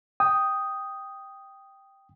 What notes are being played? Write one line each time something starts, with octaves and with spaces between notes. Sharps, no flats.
G5 D#6